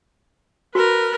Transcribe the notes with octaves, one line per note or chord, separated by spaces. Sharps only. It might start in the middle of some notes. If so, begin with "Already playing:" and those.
F#4 A#4 B4